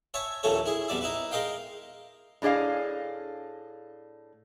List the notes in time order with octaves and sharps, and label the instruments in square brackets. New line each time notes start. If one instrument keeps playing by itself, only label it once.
[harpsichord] C#5 E5 G#5 A5
A#1 D#2 E3 A3 A4 C#5
E4 G#4
E2 B2 G3 D5 E5
D#4 E4 B4
G#3 A#4 D#5 F5 G5
[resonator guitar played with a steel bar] A2 D4 G#4 D#5 F5